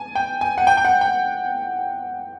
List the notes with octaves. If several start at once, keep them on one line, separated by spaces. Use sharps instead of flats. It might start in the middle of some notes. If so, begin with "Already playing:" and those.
Already playing: G#5 A5
G5
G#5
F#5
G5
G5
F#5
G5